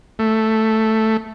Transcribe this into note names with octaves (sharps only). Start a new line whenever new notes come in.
A3